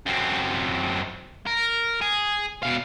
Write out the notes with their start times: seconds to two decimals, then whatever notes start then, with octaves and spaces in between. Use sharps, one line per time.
0.06 F#2 C4
1.47 A#4
2.01 G#4
2.63 B2 F5